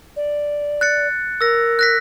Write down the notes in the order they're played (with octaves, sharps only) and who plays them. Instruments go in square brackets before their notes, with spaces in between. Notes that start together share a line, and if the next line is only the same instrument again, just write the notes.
[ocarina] D5
[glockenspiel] F#6 A6 C#7
[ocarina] A#4 [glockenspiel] E6 A#6
[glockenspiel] F#6 A#6 B6